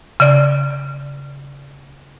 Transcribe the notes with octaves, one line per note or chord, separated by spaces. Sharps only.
C#3 D5